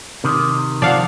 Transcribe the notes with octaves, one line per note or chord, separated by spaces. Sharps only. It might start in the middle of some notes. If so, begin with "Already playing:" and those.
C3 D#3
F3 D5 F5 F#5